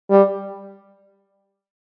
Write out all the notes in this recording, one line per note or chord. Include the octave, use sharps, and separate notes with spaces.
G3